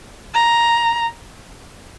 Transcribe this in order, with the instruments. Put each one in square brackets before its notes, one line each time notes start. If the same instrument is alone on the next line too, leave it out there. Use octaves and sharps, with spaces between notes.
[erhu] A#5